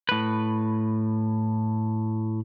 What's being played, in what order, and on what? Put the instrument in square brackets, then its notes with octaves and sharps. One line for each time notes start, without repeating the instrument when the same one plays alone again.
[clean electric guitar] A2 B4